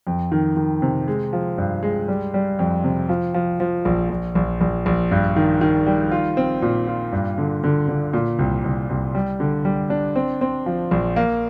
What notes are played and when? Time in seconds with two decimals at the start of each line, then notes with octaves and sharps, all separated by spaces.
0.07 F2
0.32 D#3
0.57 D#3
0.82 C3
1.08 G#3
1.33 F3
1.58 G2
1.83 G#3
2.08 G3
2.34 G3
2.59 F2
2.84 C3
3.09 F3
3.34 F3
3.60 F3
3.85 A#1
4.10 A#1
4.35 A#1
4.61 A#1
4.86 A#1
5.11 G2
5.36 D#3
5.61 D#3
5.86 G3
6.12 F4
6.37 C4
6.62 A#2
6.87 F4
7.12 G2
7.38 D3
7.64 D3
7.89 D3
8.13 A#2
8.39 C2
8.64 C2
8.89 C2
9.15 G3
9.40 D3
9.65 G3
9.90 D4
10.16 C4
10.41 C4
10.66 F3
10.91 A#1
11.16 A#3